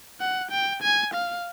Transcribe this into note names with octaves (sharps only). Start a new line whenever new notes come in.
F#5
G5
G#5
F5